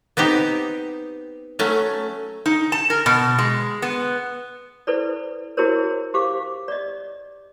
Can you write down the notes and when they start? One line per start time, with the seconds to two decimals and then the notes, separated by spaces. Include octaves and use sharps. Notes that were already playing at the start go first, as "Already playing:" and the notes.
0.17 B3 C4 D#4 G4
1.59 F#3 A3 C#4
2.46 D#4
2.72 A5
2.90 A#4
3.06 B2
3.38 G#3
3.82 B3
4.87 E4 A4 B4 C5 D5
5.57 E4 F#4 G#4 A#4 C5 C#5
6.14 G4 C5 F5 D6
6.68 D5 D#5